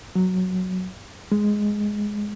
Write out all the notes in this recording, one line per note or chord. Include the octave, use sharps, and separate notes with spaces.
F#3
G#3